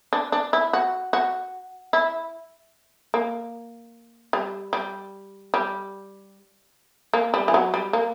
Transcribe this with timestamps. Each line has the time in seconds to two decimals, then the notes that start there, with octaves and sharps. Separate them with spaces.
0.13 D4
0.32 D4
0.53 E4
0.73 F#4
1.13 F#4
1.93 E4
3.14 A#3
4.33 G3
4.73 G3
5.54 G3
7.14 A#3
7.34 G3
7.48 E3
7.54 F#3
7.74 G3
7.93 A#3